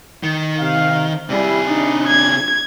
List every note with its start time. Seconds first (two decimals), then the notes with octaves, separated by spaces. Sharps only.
0.23 D#3
0.59 C3 F5
1.30 C3 G3 E4 G#4
1.68 D4 D#4
2.07 G#6